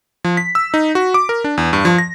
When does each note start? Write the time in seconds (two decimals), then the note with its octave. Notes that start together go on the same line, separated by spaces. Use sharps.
0.24 F3
0.37 B6
0.55 E6
0.74 D#4
0.95 F#4
1.14 D6
1.29 A#4
1.44 D4
1.58 E2
1.73 G2
1.85 F3
1.98 A#6